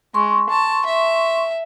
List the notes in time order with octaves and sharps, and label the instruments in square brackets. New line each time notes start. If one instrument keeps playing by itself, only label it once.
[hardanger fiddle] G#3 [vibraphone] C6 C#6
[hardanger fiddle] A5
E5